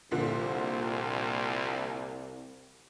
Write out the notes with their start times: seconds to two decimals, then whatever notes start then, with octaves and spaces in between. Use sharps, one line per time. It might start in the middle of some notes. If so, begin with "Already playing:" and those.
0.11 C2 A#2 D3 F3